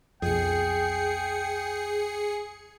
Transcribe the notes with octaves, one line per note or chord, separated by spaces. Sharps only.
B1 F2 G#4 G5 C7 C#7